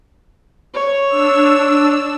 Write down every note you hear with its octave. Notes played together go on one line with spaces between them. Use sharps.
C#5
D4 E6